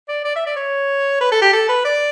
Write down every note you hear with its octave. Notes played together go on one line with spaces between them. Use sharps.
D5
D5
E5
D5
C#5
B4
A4
G4
A4
B4
D5